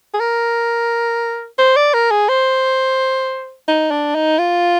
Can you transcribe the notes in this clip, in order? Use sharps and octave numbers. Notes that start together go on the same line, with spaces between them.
G#4
A#4
C5
D5
A#4
G#4
C5
D#4
D4
D#4
F4